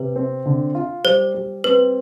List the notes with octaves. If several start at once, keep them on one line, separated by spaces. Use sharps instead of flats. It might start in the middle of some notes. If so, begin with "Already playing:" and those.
Already playing: C3 B4
C4
D3
F4
G3 C5
G3
C4 B4